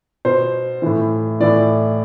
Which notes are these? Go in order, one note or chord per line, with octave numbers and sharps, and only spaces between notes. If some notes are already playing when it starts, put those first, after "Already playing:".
B2 C5
A2 E3
A2 E3 D5